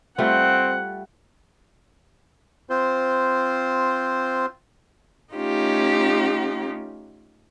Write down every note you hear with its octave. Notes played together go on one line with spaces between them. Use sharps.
G3 A3 C4 F4 F#5
C4 F4 C5
A3 C#4 D#4 F4 G4